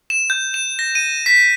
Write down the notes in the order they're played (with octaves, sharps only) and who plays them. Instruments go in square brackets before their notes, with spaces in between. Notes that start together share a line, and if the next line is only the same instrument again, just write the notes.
[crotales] E7
G6
E7
A#6
D#7
B6